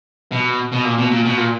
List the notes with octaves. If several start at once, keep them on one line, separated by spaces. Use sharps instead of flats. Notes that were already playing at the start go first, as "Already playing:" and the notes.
B2
B2
A#2
B2
A#2
B2
A#2